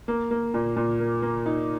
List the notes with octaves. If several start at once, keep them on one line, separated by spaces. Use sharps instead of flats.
A#3
A#3
A#2
A#2
A#3
A#3
D#4